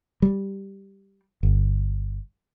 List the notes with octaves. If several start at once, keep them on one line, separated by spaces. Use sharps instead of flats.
G3
G1